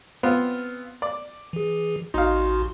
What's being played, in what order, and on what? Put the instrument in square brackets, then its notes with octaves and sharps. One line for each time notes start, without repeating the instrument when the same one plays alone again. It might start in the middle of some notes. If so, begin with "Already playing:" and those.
[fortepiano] B3 C4 F4
D5
[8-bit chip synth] E3 G#4
[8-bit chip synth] A1 F#4 C6 [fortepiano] D#4 F5